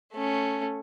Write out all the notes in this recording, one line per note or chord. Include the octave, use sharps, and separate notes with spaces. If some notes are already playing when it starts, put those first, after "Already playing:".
A3 C#4